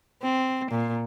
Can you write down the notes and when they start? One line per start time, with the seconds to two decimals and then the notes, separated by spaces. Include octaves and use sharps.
0.23 C4
0.71 A#2